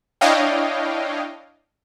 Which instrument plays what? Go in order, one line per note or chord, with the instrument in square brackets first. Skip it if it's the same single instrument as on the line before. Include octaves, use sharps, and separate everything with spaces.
[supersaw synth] D4 E4 C#5 D#5 F5 G5